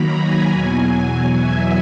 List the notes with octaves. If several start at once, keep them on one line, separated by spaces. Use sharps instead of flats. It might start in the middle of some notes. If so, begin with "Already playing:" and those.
Already playing: D#3 F#3 A#3 A#5 B5
G#5
E2 B2 F#3
E5